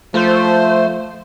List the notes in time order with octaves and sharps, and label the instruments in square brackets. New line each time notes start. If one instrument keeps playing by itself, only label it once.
[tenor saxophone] F3 [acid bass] A3 [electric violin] C5